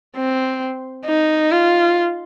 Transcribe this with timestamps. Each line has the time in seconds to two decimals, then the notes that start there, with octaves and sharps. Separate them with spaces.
0.16 C4
1.06 D#4
1.51 F4